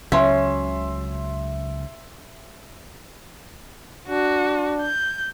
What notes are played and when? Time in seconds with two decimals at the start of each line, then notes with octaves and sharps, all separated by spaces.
0.12 C#2 C#3 F#3 C#4 E5 C6
4.09 D4 F#4
4.81 G6